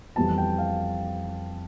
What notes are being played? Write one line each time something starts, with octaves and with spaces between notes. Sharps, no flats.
F2 E3 G3 B3 A5
G5
F5